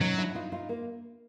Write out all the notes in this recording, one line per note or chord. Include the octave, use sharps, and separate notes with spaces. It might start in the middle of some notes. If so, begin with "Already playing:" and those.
F#3 C#4 D#4
D4 E4
D#4 F4
D#4 F4
A#3